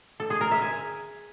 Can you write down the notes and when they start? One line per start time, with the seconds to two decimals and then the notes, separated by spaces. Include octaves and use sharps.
0.20 A4
0.30 G#4
0.41 A#4
0.51 E5
0.62 G#5